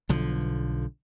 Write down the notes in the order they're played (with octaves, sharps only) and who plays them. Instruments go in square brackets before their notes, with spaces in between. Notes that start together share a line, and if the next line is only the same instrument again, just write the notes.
[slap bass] B1 D3 F3